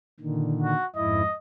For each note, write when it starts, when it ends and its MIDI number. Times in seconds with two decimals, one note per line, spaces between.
0.20 0.73 46
0.20 0.73 50
0.20 0.73 51
0.62 0.86 66
0.96 1.22 41
0.96 1.22 44
0.96 1.22 64
0.96 1.36 75